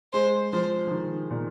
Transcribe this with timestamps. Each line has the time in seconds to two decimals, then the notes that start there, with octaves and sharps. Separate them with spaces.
0.13 G#3 C5
0.52 F3 C5
0.87 F3
0.91 D#3
1.31 A#2